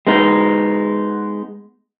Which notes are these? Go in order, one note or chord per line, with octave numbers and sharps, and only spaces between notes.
G#3 B3 D#4